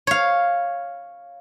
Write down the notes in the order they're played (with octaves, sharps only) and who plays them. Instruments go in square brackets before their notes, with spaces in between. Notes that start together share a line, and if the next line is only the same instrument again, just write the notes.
[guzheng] C#5 F5